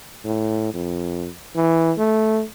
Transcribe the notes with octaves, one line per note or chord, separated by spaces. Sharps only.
A2
F2
E3
A3